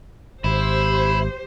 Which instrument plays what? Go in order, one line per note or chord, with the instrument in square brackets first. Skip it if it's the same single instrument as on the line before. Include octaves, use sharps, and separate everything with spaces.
[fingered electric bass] G#1 [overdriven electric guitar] E4 [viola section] G4 C5